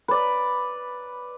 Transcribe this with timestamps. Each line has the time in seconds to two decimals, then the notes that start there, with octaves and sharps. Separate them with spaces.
0.08 B4 D5